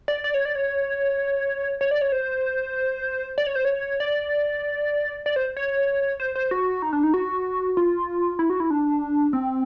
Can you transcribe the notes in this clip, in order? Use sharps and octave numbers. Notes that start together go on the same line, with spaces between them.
D5
D5
C#5
D5
C#5
C#5
D5
C#5
C5
D5
C#5
C5
C#5
D5
D5
C5
C#5
C5
C5
F#4
D#4
D4
D#4
F#4
F4
E4
F#4
E4
D4
C4